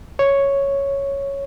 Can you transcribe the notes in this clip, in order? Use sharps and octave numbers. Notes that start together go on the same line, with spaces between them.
C#5